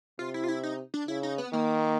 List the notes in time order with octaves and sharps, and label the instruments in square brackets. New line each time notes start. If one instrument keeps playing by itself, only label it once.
[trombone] C3 [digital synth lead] F4
[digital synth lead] E4
F4
E4
D#4
D4
[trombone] C#3 [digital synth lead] E4
[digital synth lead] D#4
B3
[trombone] D#3 [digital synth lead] A#3